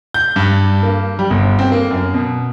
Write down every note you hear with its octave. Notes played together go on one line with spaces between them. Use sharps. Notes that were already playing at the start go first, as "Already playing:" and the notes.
G6
G2
A#3
G3
G1
C4
A#3
F#2
B2